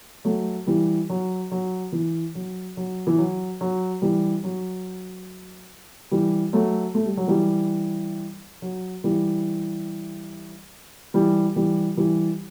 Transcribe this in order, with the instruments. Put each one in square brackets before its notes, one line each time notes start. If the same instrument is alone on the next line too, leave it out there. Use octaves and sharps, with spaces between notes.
[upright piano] F#3 A3
E3 G3
F#3
F#3
E3
F#3
F#3
E3
F#3
F#3
E3 G3
F#3
E3 G3
F#3 A3
A3
G3
F#3
E3 G3
F#3
E3 G3
E3 G3
E3 G3
E3 G3